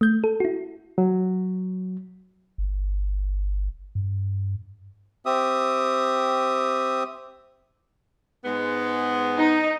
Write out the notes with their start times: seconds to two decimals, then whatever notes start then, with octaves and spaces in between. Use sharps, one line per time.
0.01 A3 G6
0.24 A4
0.40 E4 F#4
0.98 F#3
2.58 G1
3.95 G2
5.26 C4 G4 E5 D#6
8.45 G#2 G#3 B3
9.37 D#4